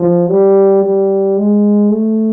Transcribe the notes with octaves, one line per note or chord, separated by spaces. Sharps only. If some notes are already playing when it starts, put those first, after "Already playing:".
Already playing: F3
G3
G3
G#3
A3